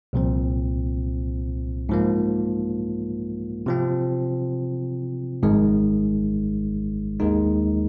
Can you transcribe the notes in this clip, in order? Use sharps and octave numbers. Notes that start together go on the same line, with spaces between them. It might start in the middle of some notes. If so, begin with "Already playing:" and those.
C2 A#2 F3 C4
G#2 F3 A#3
C3 F3 C4
G#1 G#2 D#3 G#3
D#2 D#3 G#3 D#4